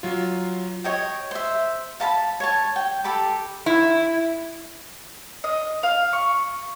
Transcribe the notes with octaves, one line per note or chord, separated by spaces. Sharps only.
F#3 F4
C#5 D#5 G5
C5 E5
F5 A5 B5
C#5 A5
G5
G4 A4 B5 D6
E4
D#5
F5
C#6